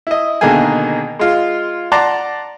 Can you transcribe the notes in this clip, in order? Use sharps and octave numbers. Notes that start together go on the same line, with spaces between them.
E4 D#5
B2 D3 D#3 A#3 G#4 G#5
G#3 F4
D5 F#5 A5 A#5 C6 D6